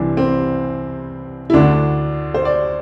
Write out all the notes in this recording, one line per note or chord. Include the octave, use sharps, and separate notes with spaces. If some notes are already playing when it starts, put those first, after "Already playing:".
Already playing: C2 C3 E3 D4
C4
E4
D2 D3 D4
C5
D5